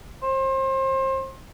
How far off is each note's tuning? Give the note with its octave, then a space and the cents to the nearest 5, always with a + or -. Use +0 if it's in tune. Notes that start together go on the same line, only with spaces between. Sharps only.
C5 +30